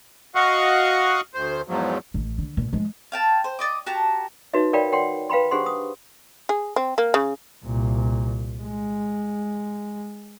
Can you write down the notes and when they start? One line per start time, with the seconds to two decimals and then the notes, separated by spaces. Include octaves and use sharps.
0.35 F#4 D#5 F5 F#5 C#6
1.34 D2 C5
1.68 E2 G#2 F3 F#3
2.14 A1
2.38 D3
2.57 A#2
2.73 F3 G#3
3.12 F5 G5 A5
3.44 C5
3.59 D5 D#5 D6
3.86 F#4 G4 A5 A#5
4.54 D#4 F#4 B4 C#5 E5
4.73 A#4 C#5 D5 F5 G5 B5
4.92 C#5 F#5 G5 C6
5.30 B4 F5 G5 B5 C6
5.51 D4 G4 G#4 C5 F#5 C6
5.66 D#6
6.49 G#4
6.76 C4
6.98 A#3
7.14 C#3
7.65 C2 A#2
8.62 G#3